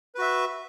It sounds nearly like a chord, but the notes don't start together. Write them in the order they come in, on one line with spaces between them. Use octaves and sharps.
B4 F#4 E5